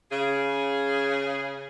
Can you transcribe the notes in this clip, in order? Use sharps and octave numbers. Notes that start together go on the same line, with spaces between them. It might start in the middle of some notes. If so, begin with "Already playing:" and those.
C#3 G#4